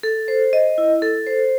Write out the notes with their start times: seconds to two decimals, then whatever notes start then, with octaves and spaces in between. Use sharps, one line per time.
0.03 A4
0.28 C5
0.53 D#5
0.78 E4
1.02 A4
1.27 C5